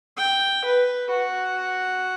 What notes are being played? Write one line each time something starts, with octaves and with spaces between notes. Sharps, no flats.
G5
B4
F#4